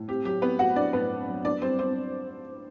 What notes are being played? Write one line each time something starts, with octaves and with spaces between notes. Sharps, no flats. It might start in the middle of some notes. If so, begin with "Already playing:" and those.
Already playing: A2
C4 G4
F#3 G4
B3 C4 B4
A2 F#4 F#5
F#3 D4 D5
A2 B3 B4
C4
F#3
B3 D4 D5
G3 C4 C5
B3 C4 C5